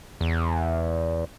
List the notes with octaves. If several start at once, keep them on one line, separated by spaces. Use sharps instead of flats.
E2